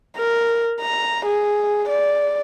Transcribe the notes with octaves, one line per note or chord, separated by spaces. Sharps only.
A#4
A#5
G#4
D5